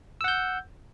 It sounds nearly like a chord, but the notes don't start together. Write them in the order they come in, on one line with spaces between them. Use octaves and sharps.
E6 F#5 G6